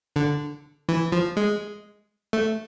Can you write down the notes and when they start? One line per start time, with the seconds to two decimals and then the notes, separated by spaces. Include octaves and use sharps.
0.16 D3
0.89 E3
1.12 F3
1.37 G#3
2.33 A3